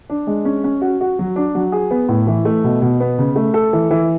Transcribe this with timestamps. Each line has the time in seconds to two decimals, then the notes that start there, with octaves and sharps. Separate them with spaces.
0.10 D4
0.27 G#3
0.45 C#4
0.64 C#4
0.82 F#4
1.01 F#4
1.19 F#3
1.36 D4
1.55 F#3
1.72 G#4
1.91 B3
2.09 A2
2.27 E3
2.45 A3
2.64 B2
2.82 B2
3.00 B3
3.19 C#3
3.36 A3
3.54 A4
3.73 E3
3.91 E3